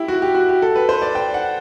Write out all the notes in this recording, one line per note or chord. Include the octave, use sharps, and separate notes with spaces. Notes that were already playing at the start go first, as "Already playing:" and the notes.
Already playing: E4 G4
F#4
G4
F#4
G4
A4
B4
C5
D5
G5
F#5